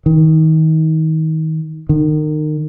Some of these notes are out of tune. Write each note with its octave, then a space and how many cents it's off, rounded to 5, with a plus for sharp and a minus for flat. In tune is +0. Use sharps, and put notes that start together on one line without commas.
D#3 +30
D#3 -30